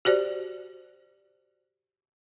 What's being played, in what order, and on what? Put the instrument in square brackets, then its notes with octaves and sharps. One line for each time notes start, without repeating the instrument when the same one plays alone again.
[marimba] F#4 G4 C5 D5